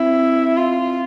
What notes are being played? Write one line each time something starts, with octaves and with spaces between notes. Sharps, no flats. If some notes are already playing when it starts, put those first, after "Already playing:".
Already playing: C4 E4
F4